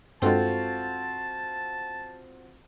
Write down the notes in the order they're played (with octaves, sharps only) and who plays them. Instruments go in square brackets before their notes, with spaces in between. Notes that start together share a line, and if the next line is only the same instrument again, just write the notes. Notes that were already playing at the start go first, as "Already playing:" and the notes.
[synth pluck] G2 G#3 [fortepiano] C4 F4 F#4 [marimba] A4 G5 [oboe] A5